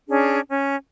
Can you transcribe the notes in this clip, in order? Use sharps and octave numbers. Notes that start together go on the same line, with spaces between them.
C#4 D4 G#4
C#4